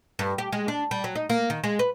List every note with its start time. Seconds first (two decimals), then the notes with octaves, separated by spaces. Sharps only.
0.19 G2
0.38 G4
0.52 G#3
0.68 D4
0.91 G3
1.04 F#3
1.16 D#4
1.30 A#3
1.50 D#3
1.64 G#3
1.79 B4